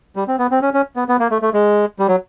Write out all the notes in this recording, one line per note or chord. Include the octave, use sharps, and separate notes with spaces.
G3
C4
B3
C4
C#4
C#4
B3
B3
A#3
A3
A3
G#3
G3
F#3